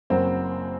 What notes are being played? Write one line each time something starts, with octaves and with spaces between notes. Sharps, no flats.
F#1 F#2 F#3 A#3 C4 C5